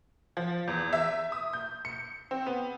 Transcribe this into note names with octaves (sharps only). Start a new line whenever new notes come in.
F3
E2
E5
D#6
G6
C#7
C4
B3